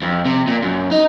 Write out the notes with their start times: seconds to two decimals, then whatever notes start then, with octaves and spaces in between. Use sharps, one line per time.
0.02 F2
0.26 C3
0.48 A#2
0.63 F#2
0.91 D#4